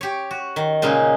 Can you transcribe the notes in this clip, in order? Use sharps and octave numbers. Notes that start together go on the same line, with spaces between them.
G4 C#5
F#4
D#3
A#2 C#3 G#3 D#4